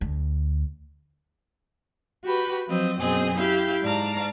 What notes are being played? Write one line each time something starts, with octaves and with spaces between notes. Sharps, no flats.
D2
F#4 G4 B4 B5
F3 F#3 C4 D#5
F#2 B2 C4 G#4 D#5
E4 G4 F5 G6
G#2 D5 F5 A5 A#5